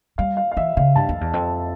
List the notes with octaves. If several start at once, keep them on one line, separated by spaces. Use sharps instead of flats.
G3 F5
F5
F5
E3 E5
C#3 F5
G2 A5
F2
E2
F2